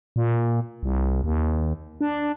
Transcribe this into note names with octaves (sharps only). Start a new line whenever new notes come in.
A#2
C2
D#2
D4